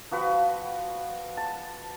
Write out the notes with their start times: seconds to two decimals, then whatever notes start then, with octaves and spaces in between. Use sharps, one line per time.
0.11 F3 F#4 B4
1.37 A5